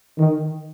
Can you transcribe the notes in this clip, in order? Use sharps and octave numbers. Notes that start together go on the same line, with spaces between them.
D#3